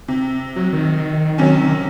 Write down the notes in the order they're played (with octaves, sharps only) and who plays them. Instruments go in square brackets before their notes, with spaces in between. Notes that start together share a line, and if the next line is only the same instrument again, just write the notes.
[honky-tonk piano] C3
[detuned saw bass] F#3
D#3
[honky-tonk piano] C3 F#3 C#4